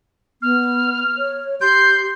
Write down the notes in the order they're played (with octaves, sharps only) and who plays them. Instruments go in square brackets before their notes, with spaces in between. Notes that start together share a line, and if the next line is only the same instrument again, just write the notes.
[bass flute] B3 [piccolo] F6
[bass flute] C#5
[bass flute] G4 [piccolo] C6 [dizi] G6